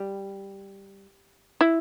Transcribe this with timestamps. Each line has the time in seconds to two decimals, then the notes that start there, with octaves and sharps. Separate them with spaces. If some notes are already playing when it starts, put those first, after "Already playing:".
Already playing: G3
1.61 E4